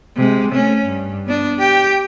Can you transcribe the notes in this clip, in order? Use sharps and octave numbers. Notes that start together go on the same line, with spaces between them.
C3 G#3
A3 C#4
G2
B3 D4
G4 G5